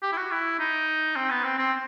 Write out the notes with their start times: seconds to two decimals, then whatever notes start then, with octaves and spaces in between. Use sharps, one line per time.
0.03 G4
0.12 E4
0.17 F#4
0.31 E4
0.59 D#4
1.16 C4
1.31 B3
1.44 C4
1.58 C4